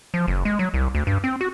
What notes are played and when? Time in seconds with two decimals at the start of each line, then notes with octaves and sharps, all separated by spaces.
0.14 F3
0.28 F#1
0.45 G#3
0.59 F#3
0.74 C2
0.95 D2
1.07 G2
1.24 C4
1.41 F#4